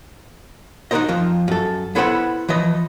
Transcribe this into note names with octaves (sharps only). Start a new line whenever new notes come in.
D#4 F#4 G#4 A#4 C5 D#5
F2 F3
F#2 A4
B3 E4 A4 B4 C5 F#5
E3 F3 B4 D#5